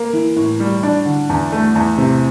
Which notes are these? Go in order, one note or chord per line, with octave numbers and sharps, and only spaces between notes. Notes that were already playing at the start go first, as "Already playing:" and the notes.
Already playing: A#3
E3
A2
G3
D4
D3
E2
A3
E2
C3